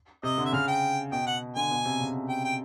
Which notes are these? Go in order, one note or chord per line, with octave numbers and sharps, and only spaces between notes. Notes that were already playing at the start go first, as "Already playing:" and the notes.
C3 D#5
D3
E5
C#3 F5
G5
B2 G5
F#5
D3 G#5
B2
C3
C#3
G5
G5